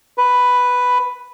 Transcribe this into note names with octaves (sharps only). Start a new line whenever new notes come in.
B4